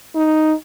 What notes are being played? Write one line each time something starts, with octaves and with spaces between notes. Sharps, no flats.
D#4